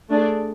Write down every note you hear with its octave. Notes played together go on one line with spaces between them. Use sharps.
A3 D4 G#4 D5